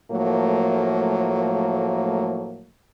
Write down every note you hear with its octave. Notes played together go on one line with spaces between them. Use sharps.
A2 F3 F#3 A3 A#3